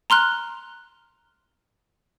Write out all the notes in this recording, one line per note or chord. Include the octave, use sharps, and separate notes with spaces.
A#5 C6 F6 F#6